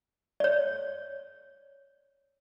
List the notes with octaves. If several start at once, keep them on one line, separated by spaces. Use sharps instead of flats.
C#5 D5